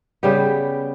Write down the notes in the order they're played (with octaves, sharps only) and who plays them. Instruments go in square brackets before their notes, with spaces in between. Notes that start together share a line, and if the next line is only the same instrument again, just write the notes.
[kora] C#3 G3 B3 G4